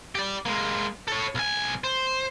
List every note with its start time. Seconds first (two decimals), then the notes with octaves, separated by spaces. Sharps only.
0.15 G4 D5
0.46 G#3 A#3
1.08 A4 C#5
1.35 B1 G#5
1.84 C5